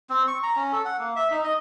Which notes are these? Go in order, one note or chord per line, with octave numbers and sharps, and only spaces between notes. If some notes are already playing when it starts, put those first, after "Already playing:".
C4
C#6
A#5
C#4
A4
F#5
A#3
E5
D#4
D#5